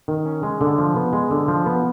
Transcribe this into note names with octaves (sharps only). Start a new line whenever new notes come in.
D#3
C#4
G#3
D3
F3
B3
G#3
D3
F3
B3